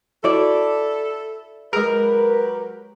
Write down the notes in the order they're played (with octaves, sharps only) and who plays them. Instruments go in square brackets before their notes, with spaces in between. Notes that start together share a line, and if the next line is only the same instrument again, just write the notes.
[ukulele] E4 D5 [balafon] F#4 [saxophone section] A4
[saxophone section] F#3 G4 B4 [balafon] G#3 G#4 [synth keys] A#4